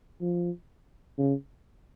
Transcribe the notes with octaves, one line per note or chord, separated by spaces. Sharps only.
F3
C#3